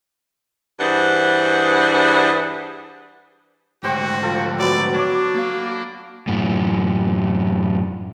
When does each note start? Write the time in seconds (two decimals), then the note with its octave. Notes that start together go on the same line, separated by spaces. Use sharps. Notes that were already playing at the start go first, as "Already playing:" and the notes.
0.80 G2 E3 D4 G#4 C5 F#5
3.84 D2 G#2 F#4 G4 C5 G5
4.23 F3 A4
4.59 F#3 B3 F#4 D5
4.94 D4 C#5 D6
5.34 A#3 F5
6.27 F#2 A2